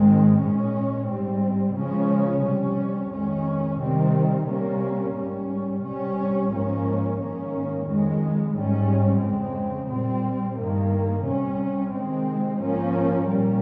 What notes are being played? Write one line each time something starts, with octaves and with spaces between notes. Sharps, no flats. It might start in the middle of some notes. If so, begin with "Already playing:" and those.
Already playing: G#2 D#3 G#3 C4
A#2 G#3 C#4
G#2 G3 C4
C#3 F3 G#3 C#4
C3 G3 C#4
F2 D#3 G#3 C#4
C3 D#3 G3 C4
C3 G3 A#3 C#4
G#2 G3 C#4
C3 G3 C#4
G#2 F3 A#3 C#4
G#2 D#3 A#3 C#4
F2 D#3 G#3
G#2 G3 C#4
F2 C#3 G#3 C4
A#2 G3 C4
G2 D#3 A#3
C3 G3 C#4
C3 D#3 G#3 C4
G#2 F3 A#3 C#4
A#2 G3 A#3 C#4